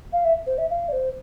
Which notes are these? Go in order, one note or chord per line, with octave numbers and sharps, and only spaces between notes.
F5
E5
C5
E5
F5
D5
C5